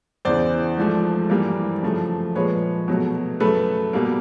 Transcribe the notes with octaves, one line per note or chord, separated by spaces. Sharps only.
E2 C#3 E3 C5 D5
G#2 F3 A3
G2 E3 G3 A#3
F#2 C#3 F3 A3
A#2 F3 G#3 B4 C#5
B2 F#3 A3
F#2 C#3 F#3 A3 A4 B4
B2 G3 A#3